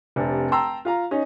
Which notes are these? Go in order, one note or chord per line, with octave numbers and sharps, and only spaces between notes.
F1 C3 D4
G5 A5 A#5 C6 E6
F4 F5 A#5
C#4 D#4